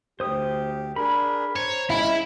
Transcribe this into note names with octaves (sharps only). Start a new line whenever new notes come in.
D2 G4 C5 D#6
D4 G#4 A#4 B5
C5 C#5 A#5
G#3 C#4 E4 E5 F5 B5